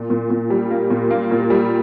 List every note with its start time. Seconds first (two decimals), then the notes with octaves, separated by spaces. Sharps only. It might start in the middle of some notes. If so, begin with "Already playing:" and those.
Already playing: A#2
0.10 A#2
0.30 A#2
0.50 G3
0.71 A#3
0.90 A#2
1.11 A#3
1.31 A#2
1.50 G3